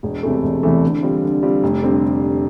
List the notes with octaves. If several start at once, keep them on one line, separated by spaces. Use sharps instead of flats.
E1
E2 C3 E3 A3
E1
E2 C3 E3 A3
D3
G3 C4 F4
D3
G3 C4 F4
F1
D3 G3 C4